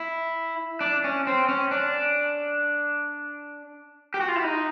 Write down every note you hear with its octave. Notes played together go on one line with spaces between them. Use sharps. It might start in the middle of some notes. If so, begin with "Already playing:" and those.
Already playing: E4
D4
C#4
C4
C#4
D4
G4
F#4
F4
E4
D#4